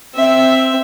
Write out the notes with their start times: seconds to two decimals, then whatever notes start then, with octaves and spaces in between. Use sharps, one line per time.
0.15 C4 E5